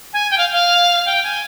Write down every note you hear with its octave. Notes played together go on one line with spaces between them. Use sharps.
G#5
G5
F5
F5
G5
G#5